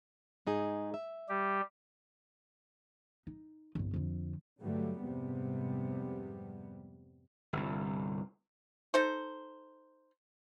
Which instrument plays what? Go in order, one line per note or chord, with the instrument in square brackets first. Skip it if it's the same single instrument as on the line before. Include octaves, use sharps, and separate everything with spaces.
[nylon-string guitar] G#2 D#4 G#4
E5
[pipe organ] G3 G4
[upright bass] D#4
G1 C2
F2 D3
[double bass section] G2 D3 F#3 G3 A3
F1 G#2 C3 G3 B3
[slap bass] G1 C2
[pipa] D#4 A4 C5